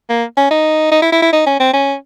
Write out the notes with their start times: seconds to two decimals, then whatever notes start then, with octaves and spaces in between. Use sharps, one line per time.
0.09 A#3
0.37 C#4
0.51 D#4
0.92 D#4
1.02 E4
1.12 E4
1.22 E4
1.33 D#4
1.46 C#4
1.60 C4
1.73 C#4